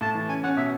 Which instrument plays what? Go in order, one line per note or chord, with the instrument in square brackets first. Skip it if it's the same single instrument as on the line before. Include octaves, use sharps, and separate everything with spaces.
[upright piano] A2 [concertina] A5
[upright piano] E3
[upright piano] C#4 [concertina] G#5
[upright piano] C#4 [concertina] F#5
[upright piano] B2 [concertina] E5